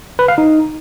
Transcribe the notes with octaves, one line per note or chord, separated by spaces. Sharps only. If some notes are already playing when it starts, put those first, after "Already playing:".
B4
F5
D#4